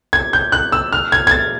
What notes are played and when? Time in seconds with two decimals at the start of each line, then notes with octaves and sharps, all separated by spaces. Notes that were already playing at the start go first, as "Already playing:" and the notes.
0.13 G#6
0.33 G6
0.52 F#6
0.72 E6
0.93 F6
1.12 G#6
1.27 G#6
1.31 A6